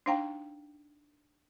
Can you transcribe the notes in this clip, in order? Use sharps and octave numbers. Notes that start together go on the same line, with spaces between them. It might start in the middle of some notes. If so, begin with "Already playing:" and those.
D4 D#4 C5 F5 G5 A#5